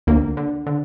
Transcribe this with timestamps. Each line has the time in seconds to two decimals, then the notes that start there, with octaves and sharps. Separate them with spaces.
0.07 D2 A#3
0.37 D3
0.67 D3